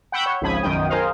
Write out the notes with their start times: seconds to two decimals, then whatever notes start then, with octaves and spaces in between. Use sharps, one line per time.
0.12 F#5 G5 B5 C#6 E6 G6
0.26 C#5
0.41 G#1 C#2 F3 B5 D#6 G#6
0.62 B1 F#2 D#3 G5 D#6
0.89 G#4 A#4 C5 D#5 F5